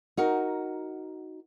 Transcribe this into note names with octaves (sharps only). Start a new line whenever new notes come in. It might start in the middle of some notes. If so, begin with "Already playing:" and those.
D#4 F#4 A#4